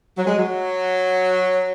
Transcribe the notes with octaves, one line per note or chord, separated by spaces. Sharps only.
F#3
G#3
F#3